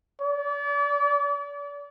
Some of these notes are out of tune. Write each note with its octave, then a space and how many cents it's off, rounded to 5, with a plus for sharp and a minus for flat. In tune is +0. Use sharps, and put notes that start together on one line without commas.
D5 -35